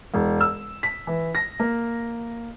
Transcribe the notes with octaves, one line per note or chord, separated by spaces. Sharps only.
E1
E6
B6
E3
A#6
A#3